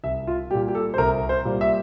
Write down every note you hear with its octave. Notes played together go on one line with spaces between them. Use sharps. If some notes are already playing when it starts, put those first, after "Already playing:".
C2 E5
F4
A#2 G3 G4
G4
A4
C5
C2 A#4
C5
A#2 G3
E5